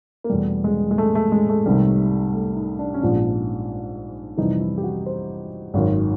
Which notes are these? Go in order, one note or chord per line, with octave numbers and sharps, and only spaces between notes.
A#3
E2 B2 G3 A3
G#3
G#3
A3
A3
G#3
A3
C2 C3 D#3 G3
A3
D#4
D4
C#4
A#1 G#2 F3 D4
F2 C3 E3 G3 D#4
E4
G4
F#4
C5
G#1 F#2 D#3